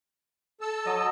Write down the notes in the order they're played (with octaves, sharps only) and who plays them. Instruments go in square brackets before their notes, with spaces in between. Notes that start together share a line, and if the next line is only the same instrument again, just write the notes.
[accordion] A4 A5 E6
[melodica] F#3 D#5